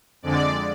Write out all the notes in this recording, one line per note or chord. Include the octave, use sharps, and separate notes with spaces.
F2 D3 G#3 D5